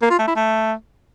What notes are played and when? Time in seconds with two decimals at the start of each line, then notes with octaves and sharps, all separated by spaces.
0.02 A#3
0.11 F4
0.19 A3
0.28 E4
0.36 A3